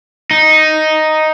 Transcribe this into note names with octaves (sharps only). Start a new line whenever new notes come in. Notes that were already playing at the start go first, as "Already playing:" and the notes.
D#4